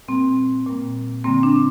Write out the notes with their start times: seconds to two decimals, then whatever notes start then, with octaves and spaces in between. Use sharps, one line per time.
0.08 A#2 G3 A#3 C4
0.66 A#2 G3 A#3
1.24 D3 G3 A#3 C4
1.43 D4